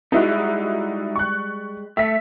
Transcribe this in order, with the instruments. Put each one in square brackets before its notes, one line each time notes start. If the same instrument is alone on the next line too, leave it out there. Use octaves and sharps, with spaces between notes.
[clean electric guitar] G3 G#3 [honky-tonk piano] D#4 E4 F#4
[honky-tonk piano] C#6 F#6
[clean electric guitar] A3 [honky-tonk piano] E5 B6